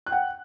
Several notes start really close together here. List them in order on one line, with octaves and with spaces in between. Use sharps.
F#6 G5 F#5